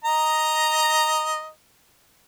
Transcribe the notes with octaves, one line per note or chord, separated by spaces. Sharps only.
D#5 A#5